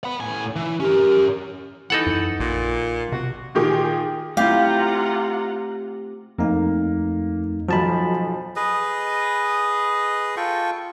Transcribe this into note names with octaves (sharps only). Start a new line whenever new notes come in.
F#5 B5
A2 G#5
E3
C#4 G4 A#4
E3 D#4 A4 F#5
F#2
A#1 A#2
C3 F#4
A#2 D#3 G4 G#4 D6
A3 C4 E4 F4 G4 F5 F#5 A#5
F2 A3 A#3 D#4
B1 F3 F#4 A5 B5
G#4 B4 D#5
F4 A4 G5 C#6